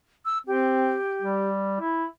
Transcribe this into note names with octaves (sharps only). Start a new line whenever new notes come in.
E6
C4 G4
G3
E4